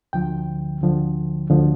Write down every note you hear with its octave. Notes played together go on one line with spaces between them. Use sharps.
D2 D3 F3 G5
D2 D3 F3
D2 D3 F3